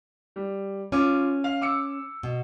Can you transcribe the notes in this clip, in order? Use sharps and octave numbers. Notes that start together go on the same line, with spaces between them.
G3
C#4 F4 D6
F5
D6 E6 C#7
B2